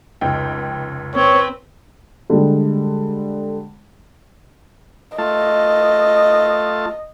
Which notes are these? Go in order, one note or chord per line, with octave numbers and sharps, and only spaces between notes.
F1 C#2 G5
C4 B4 C#5
D3 G3 G#3
A3 F4 D#5 A5